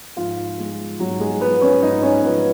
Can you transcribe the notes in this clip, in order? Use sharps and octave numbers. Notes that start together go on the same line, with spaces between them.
G#2 F3 F4
F3 G#3
G#2 F#3 F#4
G#3 G#4
F3 G#3 B3 B4
C#4 C#5
G#2 D#4 D#5
C#4 C#5
F3 G#3 B3 B4